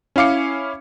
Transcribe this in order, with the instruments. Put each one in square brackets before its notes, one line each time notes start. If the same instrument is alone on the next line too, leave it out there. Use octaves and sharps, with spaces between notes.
[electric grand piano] C#4 E4 F5 D6 C#7